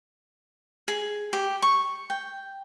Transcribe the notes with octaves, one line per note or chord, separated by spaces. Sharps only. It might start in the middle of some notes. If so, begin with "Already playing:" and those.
G#4
G4
C#6
G5